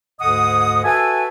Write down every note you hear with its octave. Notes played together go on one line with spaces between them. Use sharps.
D2 G#2 D3 D#5 F#5 D#6
F#4 A4 B4 E5 G#5